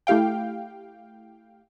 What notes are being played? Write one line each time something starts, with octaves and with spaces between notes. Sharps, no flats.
A3 E4 G4 F5 G5